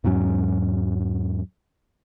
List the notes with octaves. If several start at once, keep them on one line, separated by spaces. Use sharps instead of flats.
E2 G#2 F#3 C#4